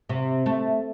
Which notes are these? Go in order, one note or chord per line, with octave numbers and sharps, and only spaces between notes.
C3
A3